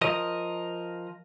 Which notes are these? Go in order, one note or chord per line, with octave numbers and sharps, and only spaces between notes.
F3 A#4 D#5